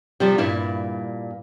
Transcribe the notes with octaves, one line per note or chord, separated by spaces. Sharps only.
C3 F3 G3
G2 A#2 E4